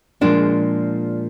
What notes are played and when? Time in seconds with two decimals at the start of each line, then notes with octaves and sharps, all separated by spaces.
0.21 A#2 F3 G#3 D4